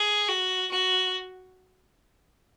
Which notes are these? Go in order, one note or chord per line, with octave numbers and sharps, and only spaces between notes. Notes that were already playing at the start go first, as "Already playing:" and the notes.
Already playing: G#4
F#4
F#4